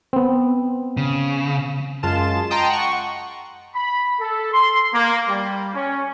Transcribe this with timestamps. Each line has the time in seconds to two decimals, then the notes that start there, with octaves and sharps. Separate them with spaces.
0.13 B3 C4
0.97 C#3
2.03 F#2 G#3 F4 A5 E7
2.51 D#5 G5 A5 A#5 C6
2.70 F#5 C#6
3.74 B5
4.19 A4
4.53 C6
4.93 A#3
5.28 G3
5.74 C#4